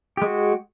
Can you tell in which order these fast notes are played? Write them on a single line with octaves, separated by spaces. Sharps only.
G4 G#3 F#4